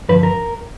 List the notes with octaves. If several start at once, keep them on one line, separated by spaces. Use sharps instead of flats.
G2 D3 F3 B4
A#4